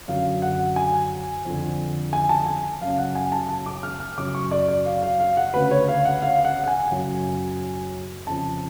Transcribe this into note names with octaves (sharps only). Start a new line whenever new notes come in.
F#2 D3 F5
F#5
G#5
F2 D3
G#5
A5
G#5
F#2 C#3 F5
F#5
G#5
A5
A5
D6
F6
F6
F#2 C#3 D6
C#6
D5
D5
F5
F5
F5
F#5
D2 C#3 B4
C#5
F5
F#5
F5
F#5
F#5
G#5
F#2 C#3
F2 C#3 A5